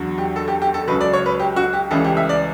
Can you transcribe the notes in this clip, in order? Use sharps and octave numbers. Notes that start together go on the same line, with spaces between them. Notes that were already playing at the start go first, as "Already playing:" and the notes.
Already playing: E2 D3 F#3
G4
A4
G4
G4
A4
C#2 C#3 F#3 B4
D5
C#5
B4
G4
F#4
G4
C#2 C#3 E3 G3 A4
G4
E5
D5